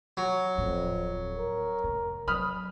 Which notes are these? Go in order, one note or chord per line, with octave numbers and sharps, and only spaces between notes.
F#3
D1 F2 A2
A#4
F1
F#3 B5 D#6 F6